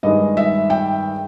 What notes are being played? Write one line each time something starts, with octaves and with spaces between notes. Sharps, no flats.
G2 D#3 G#3 D#5
E5
G5